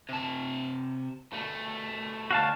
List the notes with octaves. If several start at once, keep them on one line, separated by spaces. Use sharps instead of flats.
C3 A5
B2 A3
D2 B2 F#4 F5 A5